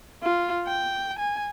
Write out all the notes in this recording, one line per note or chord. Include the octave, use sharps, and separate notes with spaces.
F4
G5
G#5